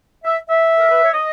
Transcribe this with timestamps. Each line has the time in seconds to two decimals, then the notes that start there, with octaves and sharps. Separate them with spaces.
0.24 E5
0.48 E5
0.79 A#4
0.90 B4
1.02 C#5
1.13 D#5